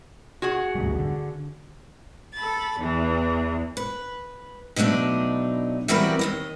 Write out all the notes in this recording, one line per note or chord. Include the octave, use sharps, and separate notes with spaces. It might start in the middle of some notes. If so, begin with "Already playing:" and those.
F#4 G#4 F#5
G#1 D2 G3
D3
A4 B5 A6
E2 E3
B4
B2 F#3 A3 D4 D#4
E3 G3 C4 F#4 A#4 B4
D#2 A#2 D#5